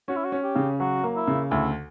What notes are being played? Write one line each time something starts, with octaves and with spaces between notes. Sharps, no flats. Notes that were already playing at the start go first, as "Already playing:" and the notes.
C#4 F#4
E4
F#4
C#4
G4
C#3
F#3 F#4
A#3
E4
C#3
D2 E4